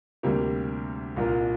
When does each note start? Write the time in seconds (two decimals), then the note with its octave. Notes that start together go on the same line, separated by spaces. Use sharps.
0.23 D2 C3 G3 A#3
1.16 C2 A#2 A#3 F4 A#4